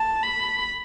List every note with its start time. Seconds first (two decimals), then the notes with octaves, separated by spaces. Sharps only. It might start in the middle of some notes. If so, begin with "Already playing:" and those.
Already playing: A5
0.23 B5